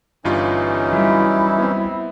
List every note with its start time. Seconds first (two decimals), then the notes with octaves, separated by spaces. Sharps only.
0.24 G1 G2 E3 C#4 D#4 F4
0.93 F#3 G3 E4
1.59 B3 C4